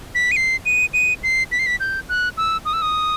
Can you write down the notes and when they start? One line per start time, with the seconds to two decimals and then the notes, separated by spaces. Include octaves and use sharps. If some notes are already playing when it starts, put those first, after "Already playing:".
0.15 B6
0.32 D#7
0.36 C7
0.66 D#7
0.94 D#7
1.23 C7
1.52 B6
1.59 C7
1.66 B6
1.80 G6
2.09 F#6
2.37 E6
2.65 D#6
2.73 E6
2.82 D#6